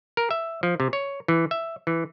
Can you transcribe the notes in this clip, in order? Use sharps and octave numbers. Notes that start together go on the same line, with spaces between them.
A#4
E5
F3
C3
C#5
E3
E5
E3